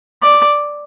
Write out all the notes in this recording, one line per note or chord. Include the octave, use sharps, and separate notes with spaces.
D5